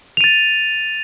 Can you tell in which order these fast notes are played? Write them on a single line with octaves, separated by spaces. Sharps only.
F7 D#7 A6